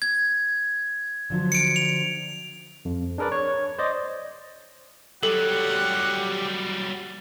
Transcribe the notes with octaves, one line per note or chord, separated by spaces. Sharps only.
G#6
D3 F3 F#3
C#7 D7
F7
F2
D4 G#4 A#4 B4 D5
C#5
C5 D5 D#5
F#3 G3 G4 A4 F#5